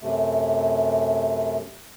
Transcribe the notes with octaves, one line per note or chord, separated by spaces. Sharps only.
F#2 C3 A3